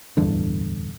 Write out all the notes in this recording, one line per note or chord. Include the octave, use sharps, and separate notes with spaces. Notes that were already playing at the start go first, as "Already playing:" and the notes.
D1 E2 G2 D3